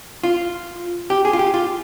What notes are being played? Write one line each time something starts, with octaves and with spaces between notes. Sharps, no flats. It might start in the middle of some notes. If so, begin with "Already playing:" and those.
F4
G4
G#4
F4
G4
F4